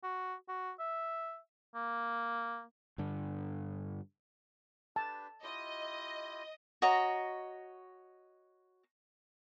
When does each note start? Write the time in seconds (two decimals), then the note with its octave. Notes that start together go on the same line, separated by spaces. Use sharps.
0.04 F#4
0.49 F#4
0.80 E5
1.75 A#3
2.98 G2 D3
4.96 D4 G4 B4 A5
5.43 E4 F4 G4 D#5
6.82 F#4 C#5 D#5 A#5